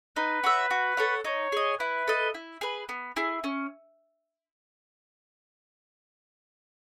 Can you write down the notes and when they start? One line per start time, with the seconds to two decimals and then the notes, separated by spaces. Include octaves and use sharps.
0.16 D#4 B4
0.44 F#4 C#5 E5
0.71 F#4
0.97 A4 C#5 F#5
1.25 D#4 C#5
1.52 G#4 D#5
1.79 E4 B4
2.07 A4 D#5
2.34 E4
2.61 G#4 B4
2.89 B3
3.16 E4 G#4
3.44 C#4